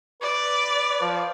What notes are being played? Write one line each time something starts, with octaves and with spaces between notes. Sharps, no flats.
B4 D5
F3